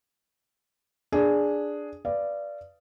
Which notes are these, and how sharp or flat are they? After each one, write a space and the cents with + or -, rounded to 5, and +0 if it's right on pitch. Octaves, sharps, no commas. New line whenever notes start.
D4 +0 G#4 +0
B4 +5 D5 +0 F5 -30